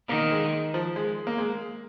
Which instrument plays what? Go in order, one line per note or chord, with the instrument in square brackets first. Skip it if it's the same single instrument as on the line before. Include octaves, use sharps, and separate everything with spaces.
[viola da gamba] D#3 [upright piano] A#3
[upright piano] G#3
F3
G#3
A#3
G#3